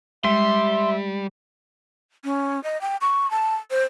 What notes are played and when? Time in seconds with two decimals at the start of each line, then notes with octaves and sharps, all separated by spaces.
0.25 G3 G#3 E5 C6
2.25 C#4
2.63 D#5
2.81 G5
3.01 C#6
3.31 A5
3.71 C5